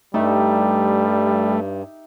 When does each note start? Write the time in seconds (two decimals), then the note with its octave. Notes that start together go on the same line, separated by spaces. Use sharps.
0.14 G2 G3 A3 D#4 G4 E5